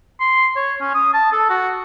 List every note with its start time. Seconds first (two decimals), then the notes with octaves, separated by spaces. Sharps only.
0.20 C6
0.56 C#5
0.81 C#4
0.94 D#6
1.14 A5
1.33 A4
1.50 F#4